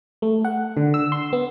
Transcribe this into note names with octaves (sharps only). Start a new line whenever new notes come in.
A3
F#5
D3
E6
C6
B3